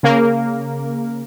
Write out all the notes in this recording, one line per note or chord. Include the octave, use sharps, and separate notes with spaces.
C#3 A#3 A#4